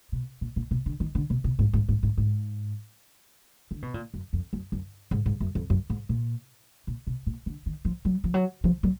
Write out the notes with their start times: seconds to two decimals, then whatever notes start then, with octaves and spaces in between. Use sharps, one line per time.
0.12 B2
0.41 A#2
0.56 A#2
0.71 B2
0.86 D3
1.00 D#3
1.15 D3
1.30 B2
1.44 B2
1.59 G#2
1.73 G#2
1.88 G#2
2.03 G#2
2.18 G#2
3.71 D3
3.82 B2
3.94 A#2
4.14 F#2
4.33 F2
4.53 F#2
4.72 F#2
5.11 G#2
5.26 G#2
5.40 F#2
5.55 F2
5.70 F#2
5.90 G#2
6.09 A#2
6.87 A#2
7.07 B2
7.27 A#2
7.46 D3
7.66 D#3
7.85 F3
8.05 F#3
8.24 F3
8.34 F#3
8.64 F3
8.83 F#3